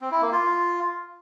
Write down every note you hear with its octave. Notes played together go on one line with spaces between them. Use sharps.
C4
E4
A#3
F4